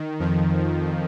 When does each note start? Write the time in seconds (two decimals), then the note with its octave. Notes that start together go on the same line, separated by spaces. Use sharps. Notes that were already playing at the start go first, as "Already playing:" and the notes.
Already playing: D#3
0.19 F2 F3